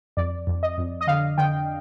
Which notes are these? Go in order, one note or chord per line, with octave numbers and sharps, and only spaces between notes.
F2 D5
F2
D#5
F2
D#5
D3 F5
D3 G5